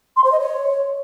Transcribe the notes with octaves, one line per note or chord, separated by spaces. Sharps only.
C6
C5
D#5
C#5